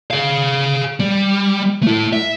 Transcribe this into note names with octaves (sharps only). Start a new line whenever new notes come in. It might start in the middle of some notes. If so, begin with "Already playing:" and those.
G#4 F5
G3
A3 E4
E5